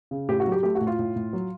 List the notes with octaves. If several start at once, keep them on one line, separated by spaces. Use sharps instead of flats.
C#3
A2 G4
F#4
F#3
G4
A3 G4
F#4
A2
F4
A2
A2
F#3